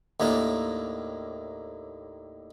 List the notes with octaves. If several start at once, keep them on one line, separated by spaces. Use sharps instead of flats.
D#2 A2 A#3 D4